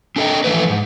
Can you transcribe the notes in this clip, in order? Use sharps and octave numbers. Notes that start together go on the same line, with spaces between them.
C4 D4 A4 A#4 D#5 G5
E3 F3 A3 B4
G#2